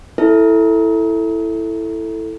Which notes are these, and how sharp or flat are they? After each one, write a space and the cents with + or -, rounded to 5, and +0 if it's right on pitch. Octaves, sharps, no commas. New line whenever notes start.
E4 +0 A4 +5